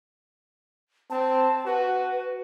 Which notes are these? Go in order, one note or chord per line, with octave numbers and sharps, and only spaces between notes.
C4 A5
F#4 B4